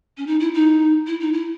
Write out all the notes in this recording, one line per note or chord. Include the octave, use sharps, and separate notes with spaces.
C#4
D#4
E4
D#4
E4
D#4
E4